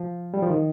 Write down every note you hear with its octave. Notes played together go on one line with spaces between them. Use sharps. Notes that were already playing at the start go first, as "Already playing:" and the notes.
Already playing: F3
G3
F3
D#3